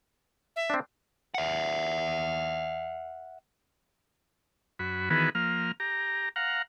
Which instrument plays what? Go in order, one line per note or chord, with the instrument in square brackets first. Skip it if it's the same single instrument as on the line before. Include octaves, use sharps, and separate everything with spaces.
[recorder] E5
[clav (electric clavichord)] C4 D4
[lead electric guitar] E5 F#5
[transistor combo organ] F#2 F#4 B5
D#3 E3 B3 F#4 G#4 B4
F3 A#3 F6
G4 A#5
F5 F#5 A#5